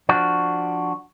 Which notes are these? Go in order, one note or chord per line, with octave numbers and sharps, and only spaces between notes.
F3 D4 F#4